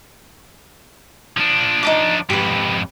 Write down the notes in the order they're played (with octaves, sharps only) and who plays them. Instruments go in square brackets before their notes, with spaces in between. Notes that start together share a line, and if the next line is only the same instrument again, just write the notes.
[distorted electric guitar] F3 D4
[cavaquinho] D#4 A5 D6
[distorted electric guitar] F2 G#2 [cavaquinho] G4 B4